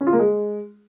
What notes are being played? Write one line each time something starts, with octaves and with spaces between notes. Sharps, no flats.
C#4
F4
A#3
G#3